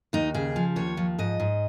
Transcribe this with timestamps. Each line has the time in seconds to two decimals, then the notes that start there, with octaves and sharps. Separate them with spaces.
0.13 D#2 D#4
0.34 C#3 G#4
0.56 F3
0.76 D#2 C#5
0.97 F3
1.18 G#2 D#5
1.40 G#2